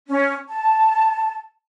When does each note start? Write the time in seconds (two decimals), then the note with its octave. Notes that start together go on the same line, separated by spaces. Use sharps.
0.09 C#4
0.49 A5